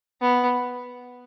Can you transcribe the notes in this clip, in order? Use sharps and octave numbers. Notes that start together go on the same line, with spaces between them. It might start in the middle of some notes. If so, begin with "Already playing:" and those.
B3